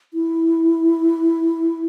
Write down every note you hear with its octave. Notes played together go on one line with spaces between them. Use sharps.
E4